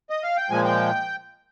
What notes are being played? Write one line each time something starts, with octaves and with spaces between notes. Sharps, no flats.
D#5
F5
G5
A#2 F3 G#3 G#5
G5